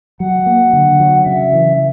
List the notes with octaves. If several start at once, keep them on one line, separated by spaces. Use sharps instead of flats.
F#3 F#5
A#3
D3
F#3
C#3 E5
E3